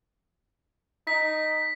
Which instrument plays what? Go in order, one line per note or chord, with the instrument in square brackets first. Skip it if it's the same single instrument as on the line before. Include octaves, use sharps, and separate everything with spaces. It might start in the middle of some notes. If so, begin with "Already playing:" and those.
[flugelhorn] D#4 [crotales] B6